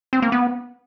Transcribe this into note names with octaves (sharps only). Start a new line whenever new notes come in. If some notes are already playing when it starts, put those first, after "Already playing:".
C4
A#3
B3